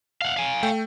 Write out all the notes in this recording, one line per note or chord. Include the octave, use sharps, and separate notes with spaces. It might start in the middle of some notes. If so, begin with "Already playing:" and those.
F5 F#5
F5 G#5
A3 G5